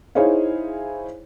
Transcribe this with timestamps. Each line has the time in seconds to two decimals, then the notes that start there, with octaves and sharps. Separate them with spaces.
0.15 D#4 E4 G#4 C5 C#5 F5